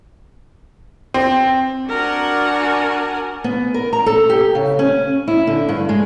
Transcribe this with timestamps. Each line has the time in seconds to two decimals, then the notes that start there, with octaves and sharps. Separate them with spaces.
1.14 C4
1.88 D4 F#4 A#4 F#5 G#5
3.44 B3
3.74 A#4
3.93 A#5
4.06 A4
4.30 G4
4.55 C#3
4.79 C#4
5.28 E4
5.47 D3
5.69 G2
5.89 G#3